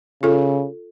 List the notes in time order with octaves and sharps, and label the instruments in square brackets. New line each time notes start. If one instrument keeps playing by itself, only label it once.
[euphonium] C#3 [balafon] F4 A4